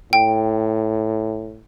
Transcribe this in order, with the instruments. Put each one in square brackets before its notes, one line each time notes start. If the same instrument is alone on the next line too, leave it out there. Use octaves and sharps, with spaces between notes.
[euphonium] A2 [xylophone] G5